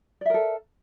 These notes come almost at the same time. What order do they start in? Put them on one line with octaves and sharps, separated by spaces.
D5 E5 A#4 A4